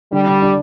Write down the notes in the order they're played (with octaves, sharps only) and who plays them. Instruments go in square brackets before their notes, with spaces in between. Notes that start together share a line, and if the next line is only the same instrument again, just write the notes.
[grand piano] D3 [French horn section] G3
[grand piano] D3
D4